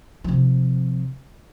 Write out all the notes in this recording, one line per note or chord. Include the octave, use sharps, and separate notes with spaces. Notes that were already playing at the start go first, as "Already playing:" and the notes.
C3 F3